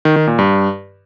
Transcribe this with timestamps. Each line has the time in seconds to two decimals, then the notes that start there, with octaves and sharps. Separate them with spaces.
0.05 D#3
0.16 D#3
0.27 A#2
0.38 G2